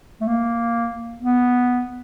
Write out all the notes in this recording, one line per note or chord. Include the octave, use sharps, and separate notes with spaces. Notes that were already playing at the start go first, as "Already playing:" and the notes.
A3
A#3
B3